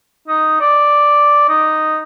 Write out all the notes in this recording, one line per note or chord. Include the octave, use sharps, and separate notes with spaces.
D#4
D5
D#4